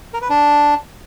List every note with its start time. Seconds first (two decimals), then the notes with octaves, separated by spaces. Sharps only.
0.14 A#4
0.22 B4
0.29 D4